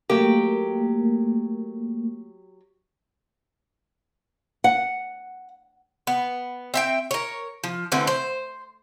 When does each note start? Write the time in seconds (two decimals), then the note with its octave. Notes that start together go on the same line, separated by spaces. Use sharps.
0.09 F#3 A3 A#3 G4
4.64 F#5
6.07 B3
6.74 C4 E5 G5
7.11 A#4 C#5
7.64 F3
7.92 D3 E3 A3 C4
8.07 C5